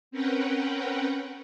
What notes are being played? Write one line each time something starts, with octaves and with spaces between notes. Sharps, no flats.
C4 C#4 A#4 B4 F#5 G5